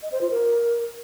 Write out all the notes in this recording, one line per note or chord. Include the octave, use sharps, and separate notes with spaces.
D#5
C5
F4
A#4